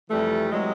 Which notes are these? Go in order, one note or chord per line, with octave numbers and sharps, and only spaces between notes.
F2 C3 E3 G3 A3
C3 E3 F#3 G#3